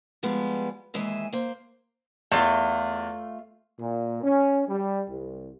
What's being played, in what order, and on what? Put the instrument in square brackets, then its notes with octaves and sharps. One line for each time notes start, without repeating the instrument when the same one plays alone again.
[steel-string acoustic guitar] F3 G3 G#3 B3
D#2 E3 G#3 E5 G#5
A#3 C5
[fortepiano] E2 [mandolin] A3 F4
[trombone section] A#2
C#4
G3
C2